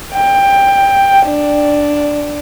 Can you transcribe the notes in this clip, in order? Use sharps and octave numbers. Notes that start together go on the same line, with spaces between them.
G5
D4